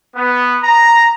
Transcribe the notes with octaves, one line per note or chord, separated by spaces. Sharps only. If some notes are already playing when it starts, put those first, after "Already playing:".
B3
A#5